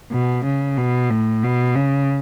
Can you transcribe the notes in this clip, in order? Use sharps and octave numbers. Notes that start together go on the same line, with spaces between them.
B2
C#3
B2
A2
B2
C#3